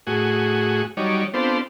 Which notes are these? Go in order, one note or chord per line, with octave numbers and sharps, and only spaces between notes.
A2 F#4 G#4
F#3 G3 D#4 C#5 D5
B3 C4 D4 F4 A4 C5